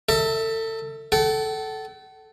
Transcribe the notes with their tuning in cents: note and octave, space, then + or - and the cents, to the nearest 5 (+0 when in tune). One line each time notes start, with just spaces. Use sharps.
A4 +30 E5 -15
A4 -10 F#5 +45